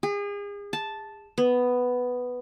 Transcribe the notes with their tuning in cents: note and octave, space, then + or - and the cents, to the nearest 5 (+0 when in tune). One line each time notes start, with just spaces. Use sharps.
G#4 -35
A5 -5
B3 +5